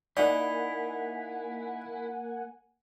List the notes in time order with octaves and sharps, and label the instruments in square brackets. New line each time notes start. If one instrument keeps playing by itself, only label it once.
[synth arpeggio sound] A#3 F#5 G#5 [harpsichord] D#4 [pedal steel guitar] E4 [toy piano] D5